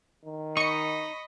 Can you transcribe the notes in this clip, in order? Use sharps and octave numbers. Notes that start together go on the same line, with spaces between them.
D#3
D#4 D#5 B5 C#6 C#7